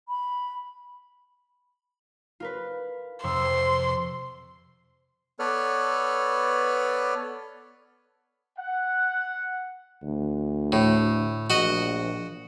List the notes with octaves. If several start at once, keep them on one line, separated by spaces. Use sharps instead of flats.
B5
F4 A#4 B4
F2 C3 C6 E6
B3 A4 B4 C#5 D5 F6
F#5
D2
A2
A#1 F#4 D#5